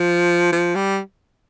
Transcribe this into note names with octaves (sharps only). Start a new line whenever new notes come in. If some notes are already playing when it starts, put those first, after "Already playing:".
Already playing: F3
F3
G3